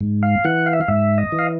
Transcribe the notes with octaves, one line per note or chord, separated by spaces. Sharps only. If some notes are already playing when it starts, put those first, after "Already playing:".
G#2
F5
E3 F#5
F5
E5
F5
G#2 E5
D#5
E3
F5